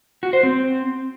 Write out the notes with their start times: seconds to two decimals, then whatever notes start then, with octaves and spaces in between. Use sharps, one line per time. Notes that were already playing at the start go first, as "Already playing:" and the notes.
0.23 F#4
0.33 C5
0.43 C4